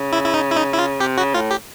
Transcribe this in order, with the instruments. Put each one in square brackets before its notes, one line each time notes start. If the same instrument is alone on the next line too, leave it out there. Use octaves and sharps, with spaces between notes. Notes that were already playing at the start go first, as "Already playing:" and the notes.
Already playing: [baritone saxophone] C#3
[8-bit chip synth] E4
E4
D#4
E4
D#4
E4
F4
[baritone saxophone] C3 [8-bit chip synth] G4
[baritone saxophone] C#3 [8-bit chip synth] F#4
[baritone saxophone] A2 [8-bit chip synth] F4
[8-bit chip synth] G4